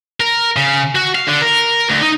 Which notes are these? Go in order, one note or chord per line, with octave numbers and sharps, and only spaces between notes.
A#4
C#3
F#4
F5
D3
A#4
D2
D#4